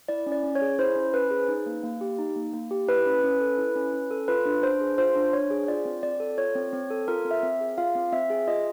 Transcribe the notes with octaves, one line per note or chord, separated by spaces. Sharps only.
E4 D5
C#4
D5
C#4
C#5
G#4
E4 C5
C#4
C#4 B4
G#4
D#4
A#3
A#3
G4
D#4
A#3
A#3
G4
E4 B4
C#4
C#4
A4
E4
C#4
C#4
A4
F4 B4
D4
D4 C5
G#4
F4 C5
D4
D4 C#5
G#4
F4 D5
C4
C4 D5
A4
F4 C#5
C4
C4
A4
F4 A#4
C4
E5
C4
G#4
F4 F5
C4
C4 E5
G#4
F4 D#5